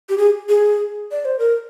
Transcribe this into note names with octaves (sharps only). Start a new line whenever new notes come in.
G4
G#4
G#4
D5
C5
A#4